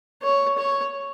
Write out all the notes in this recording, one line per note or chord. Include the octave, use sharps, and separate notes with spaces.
C#5
C#5